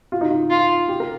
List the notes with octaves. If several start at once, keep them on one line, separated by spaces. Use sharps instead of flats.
F4
D#4
F4
F4
G4
A#4